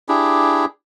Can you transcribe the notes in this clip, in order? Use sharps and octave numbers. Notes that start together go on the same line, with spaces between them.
D4 E4 G4 G#4